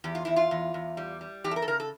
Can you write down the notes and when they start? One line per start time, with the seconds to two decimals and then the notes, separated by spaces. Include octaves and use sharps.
0.04 E2 G4
0.15 F4
0.25 E2 E4
0.36 F4
0.51 E2
0.74 E2
0.97 G3
1.21 G3
1.44 E2 G4
1.51 A4
1.56 A#4
1.62 A4
1.67 C#3 A#4
1.80 A4